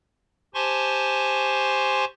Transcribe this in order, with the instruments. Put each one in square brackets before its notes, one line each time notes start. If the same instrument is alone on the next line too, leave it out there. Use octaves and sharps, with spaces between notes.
[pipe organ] G4 C5 G#5 A5 C6 C#6